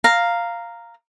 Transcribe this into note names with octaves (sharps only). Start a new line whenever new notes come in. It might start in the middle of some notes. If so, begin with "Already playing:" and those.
F5 A#5